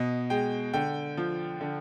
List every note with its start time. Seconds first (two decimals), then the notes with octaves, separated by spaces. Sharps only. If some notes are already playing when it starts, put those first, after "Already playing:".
Already playing: B2 D#5
0.30 G#3 G5
0.74 D3 G5
1.17 F3
1.61 D3